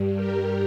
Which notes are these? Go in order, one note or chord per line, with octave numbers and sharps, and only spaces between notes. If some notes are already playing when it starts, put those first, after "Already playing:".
Already playing: G2 G3
G4 A#4